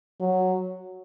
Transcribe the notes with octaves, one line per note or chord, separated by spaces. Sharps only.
F#3